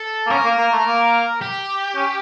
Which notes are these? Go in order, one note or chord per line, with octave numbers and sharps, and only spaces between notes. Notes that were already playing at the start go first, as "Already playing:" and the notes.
Already playing: A4
A#3
C#4 A#4
A#3
A#3
A3
A#3
G4
C#4